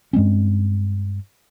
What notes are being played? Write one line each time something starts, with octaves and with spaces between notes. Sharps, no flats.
G2 G#3 C4 C#4